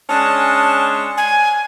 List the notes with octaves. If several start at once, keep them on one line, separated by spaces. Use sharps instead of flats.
G#3 C#4 D4 A5
G#5